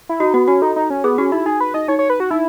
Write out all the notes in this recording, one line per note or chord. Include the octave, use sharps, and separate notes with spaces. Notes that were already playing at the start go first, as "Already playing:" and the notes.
E4
D#4 F#4
B3 F#4
C#4 F#4
D#4 A4
D#4
C#4
B3 G#4
C#4 F#4
D#4 E4
D#4 G#4
B4
D#4 D#5
D#4 C#5
C#5
B4
F#4
D#4 E4